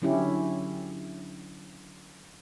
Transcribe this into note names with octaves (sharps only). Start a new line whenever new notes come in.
D3 F#3 C#4 E4 G4